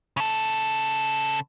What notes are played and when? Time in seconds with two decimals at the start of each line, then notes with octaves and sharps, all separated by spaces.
0.17 C#3 A4